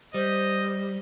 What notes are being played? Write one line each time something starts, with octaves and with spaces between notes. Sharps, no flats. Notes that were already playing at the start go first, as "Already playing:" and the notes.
G3 C5 D#5